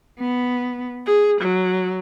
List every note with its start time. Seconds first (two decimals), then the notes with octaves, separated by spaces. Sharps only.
0.19 B3
1.05 G#4
1.41 F#3